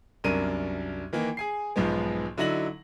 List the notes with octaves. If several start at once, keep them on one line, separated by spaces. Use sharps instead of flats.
C2 F#2 D4 A#4 D#7
D#3 E3 A#3
G#4 G#5 C7
B1 G#2 F3 G#3 B3
D3 F#3 D#4 E4 A#6 F#7